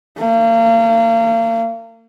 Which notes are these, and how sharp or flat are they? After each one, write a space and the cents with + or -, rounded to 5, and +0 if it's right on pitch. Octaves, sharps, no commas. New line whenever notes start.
A#3 -35